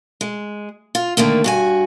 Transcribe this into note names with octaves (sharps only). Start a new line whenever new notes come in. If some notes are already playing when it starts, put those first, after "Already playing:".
G#3
F4
D3 D#3 A3 A#3
G2 F#4 G#5